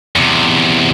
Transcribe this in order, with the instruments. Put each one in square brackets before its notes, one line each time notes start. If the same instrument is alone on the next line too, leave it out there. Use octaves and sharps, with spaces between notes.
[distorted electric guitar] E2 C3